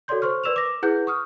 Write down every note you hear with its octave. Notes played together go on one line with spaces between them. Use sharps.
F#4 A4 C#5 D5 C6 G6
C5 C6 C#6 F6
A#4 B4 D5 E6 E7 F7
D6 A#6
E4 G#4 B4 F#5 F#6 G6
C#6 D#6 F6